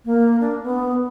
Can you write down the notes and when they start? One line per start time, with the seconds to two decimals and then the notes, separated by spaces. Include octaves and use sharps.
0.05 A#3
0.40 D4
0.63 B3